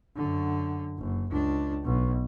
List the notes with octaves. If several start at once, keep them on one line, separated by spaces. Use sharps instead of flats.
F#2 D3
F#1
C#2 D4
B1 B2